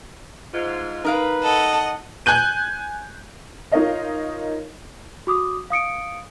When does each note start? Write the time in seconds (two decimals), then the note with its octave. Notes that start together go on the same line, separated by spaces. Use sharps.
0.53 G#2 F4
1.05 D#4 A#4 B4 F5
1.42 A4 D#5 F#5
2.26 G#5 F#6 G6 D#7
3.72 D#4 F4 A#4 C#5 D#5 F5
5.27 F#4 D6 D#6
5.70 F5 D#6 C#7 D7